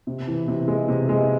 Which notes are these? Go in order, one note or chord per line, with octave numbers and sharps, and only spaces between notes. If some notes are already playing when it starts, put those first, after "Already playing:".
C3
E3
C3
G#3
C3
G#3